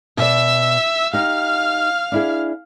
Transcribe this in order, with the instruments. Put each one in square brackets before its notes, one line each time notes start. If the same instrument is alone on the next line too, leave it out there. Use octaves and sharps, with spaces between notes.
[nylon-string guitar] B2 C5 D5 [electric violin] E5 E6
[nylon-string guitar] D#4 G4 [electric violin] F5 F6
[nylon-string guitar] D4 E4 G#4